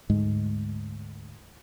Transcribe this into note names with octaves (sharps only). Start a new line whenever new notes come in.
D2 G#2 G#3